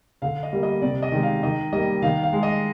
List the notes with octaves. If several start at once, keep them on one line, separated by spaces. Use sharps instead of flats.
D3 F5
D#5
G3 A#3
D#5
C3 D5
D#5
D#3 G#3
F5
D#3 D#5
G3 A#3 D#5
D#3 F5
F5
G#3
D#5